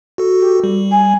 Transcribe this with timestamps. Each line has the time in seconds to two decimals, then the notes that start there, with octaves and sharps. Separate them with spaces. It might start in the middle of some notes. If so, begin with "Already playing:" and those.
0.18 F#4 A4
0.40 G4
0.64 G3
0.91 G#5